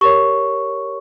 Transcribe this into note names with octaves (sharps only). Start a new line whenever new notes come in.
G4 A#4 C#5 C#6